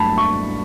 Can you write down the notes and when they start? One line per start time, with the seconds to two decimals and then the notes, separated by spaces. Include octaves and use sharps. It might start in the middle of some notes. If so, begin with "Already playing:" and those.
Already playing: G2 F#3 A3 A5 B5
0.18 C#6